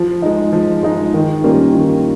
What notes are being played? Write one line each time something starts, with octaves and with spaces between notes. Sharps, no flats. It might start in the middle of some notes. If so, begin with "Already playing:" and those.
Already playing: F3
G#3 D#4
F3
G#3 D#4
D#3
G3 A#3 C#4 F4
D#3